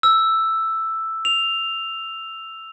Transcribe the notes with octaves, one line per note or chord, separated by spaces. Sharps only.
E6
F7